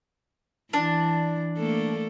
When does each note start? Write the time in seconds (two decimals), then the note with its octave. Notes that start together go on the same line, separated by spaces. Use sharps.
0.73 E3 D4
1.58 A3 A#3 A4